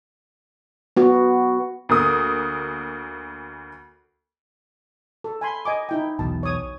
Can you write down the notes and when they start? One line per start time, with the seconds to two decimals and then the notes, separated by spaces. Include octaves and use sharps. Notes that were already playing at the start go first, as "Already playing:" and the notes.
0.97 B3 F#4
1.89 D2 A#3 D#6
5.24 A4
5.41 G#5 B5 C6
5.65 D#5 G#5 D6
5.89 D#4 E4 G5
6.19 B1 E2 B2 A5
6.43 C#5 D#6